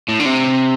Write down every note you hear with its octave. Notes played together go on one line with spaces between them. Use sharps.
A2
D3
C3